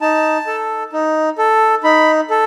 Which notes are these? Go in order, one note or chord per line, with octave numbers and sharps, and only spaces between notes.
D#4 A5
A4
D#4
A4
D#4 B5
A4